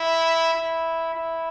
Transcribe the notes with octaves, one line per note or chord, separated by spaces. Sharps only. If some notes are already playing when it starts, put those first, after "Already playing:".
Already playing: E4
E4
E4